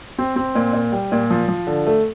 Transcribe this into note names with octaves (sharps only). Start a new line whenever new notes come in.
C4
C4
A#2
A#2
G3
A#2
F3
F3
D3
A3